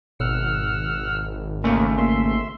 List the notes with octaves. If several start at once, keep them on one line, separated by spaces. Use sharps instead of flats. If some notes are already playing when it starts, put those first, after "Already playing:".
G#1 B2 F#5 E6 F6
D#2 C#3 A3 A#3
A#3 E5 C6